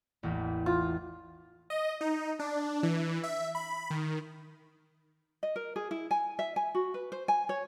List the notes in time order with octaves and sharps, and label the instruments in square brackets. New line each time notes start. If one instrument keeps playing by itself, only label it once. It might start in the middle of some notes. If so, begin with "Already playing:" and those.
[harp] A1 E2 A#3
[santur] F4
[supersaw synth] D#5
D#4
D4
E3
E5
B5
D#3
[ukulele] D#5
A#4
G#4
E4
G#5
E5
G#5
F#4
B4
C5
G#5
C#5